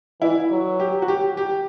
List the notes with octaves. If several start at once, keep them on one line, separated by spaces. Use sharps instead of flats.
E3 E4
F#3
G4
F#4
G4
G4